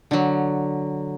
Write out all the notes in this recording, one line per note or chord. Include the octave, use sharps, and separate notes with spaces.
D3 F#3